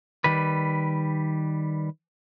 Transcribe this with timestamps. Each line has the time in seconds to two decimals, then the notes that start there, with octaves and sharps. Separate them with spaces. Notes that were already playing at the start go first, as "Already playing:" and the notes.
0.24 D#3 G3 B4